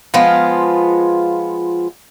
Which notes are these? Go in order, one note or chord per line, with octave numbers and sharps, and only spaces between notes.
F3 G#3 B3 F4